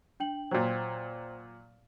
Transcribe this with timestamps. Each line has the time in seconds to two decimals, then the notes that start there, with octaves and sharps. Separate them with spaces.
0.20 D4 G5 F#7
0.51 A#2 F#3 C5 G5